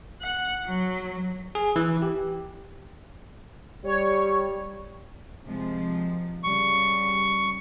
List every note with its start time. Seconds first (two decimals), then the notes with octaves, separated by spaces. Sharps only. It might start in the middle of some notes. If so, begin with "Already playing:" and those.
0.21 F#5
0.66 F#3
1.55 G#4
1.76 E3
2.02 G4
3.84 G3 C#5
5.46 C3 F3 G#3
6.44 C#3 G3 C#6